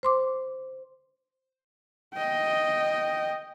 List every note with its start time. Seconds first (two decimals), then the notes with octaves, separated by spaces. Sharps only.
0.03 C5 C6 D6
2.14 D#5 G5